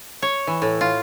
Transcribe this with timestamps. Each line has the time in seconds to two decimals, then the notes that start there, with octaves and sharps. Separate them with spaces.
0.22 C#5
0.47 E3
0.62 A2
0.81 F4